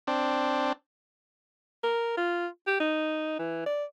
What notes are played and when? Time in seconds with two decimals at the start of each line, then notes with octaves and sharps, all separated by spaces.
0.07 C4 D4
1.83 A#4
2.17 F4
2.67 G4
2.80 D#4
3.39 E3
3.66 D5